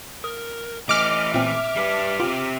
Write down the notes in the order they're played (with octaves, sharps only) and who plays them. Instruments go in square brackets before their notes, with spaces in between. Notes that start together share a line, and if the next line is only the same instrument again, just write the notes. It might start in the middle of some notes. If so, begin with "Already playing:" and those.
[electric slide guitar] A#4 [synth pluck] D#6
[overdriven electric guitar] E3 A3 [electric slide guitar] D#5 [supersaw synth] D6 F6
[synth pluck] A#2 C4 [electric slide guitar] E5
[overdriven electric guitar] G3 B4 [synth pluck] C7
[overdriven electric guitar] C4 G4 [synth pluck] F4